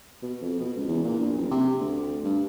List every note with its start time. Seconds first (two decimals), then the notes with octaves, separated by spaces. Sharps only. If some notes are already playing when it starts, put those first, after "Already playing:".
0.22 B2
0.41 F2
0.59 B2
0.76 C#2
0.88 E2
1.04 A#2
1.19 A#1
1.36 F#1
1.51 C3
1.80 D2
2.24 G2